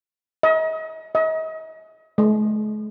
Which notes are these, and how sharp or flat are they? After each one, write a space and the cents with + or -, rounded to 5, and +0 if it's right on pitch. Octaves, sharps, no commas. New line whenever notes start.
D#5 +40
D#5 +40
G#3 +45